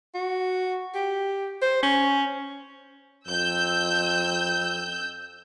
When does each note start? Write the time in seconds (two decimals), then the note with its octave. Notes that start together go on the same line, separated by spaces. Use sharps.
0.14 F#4
0.95 G4
1.62 C5
1.83 C#4
3.28 F2 E6 G6